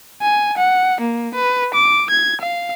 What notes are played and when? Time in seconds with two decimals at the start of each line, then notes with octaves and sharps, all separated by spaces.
0.22 G#5
0.57 F#5
1.01 A#3
1.35 B4
1.74 D6
2.10 G#6
2.41 F5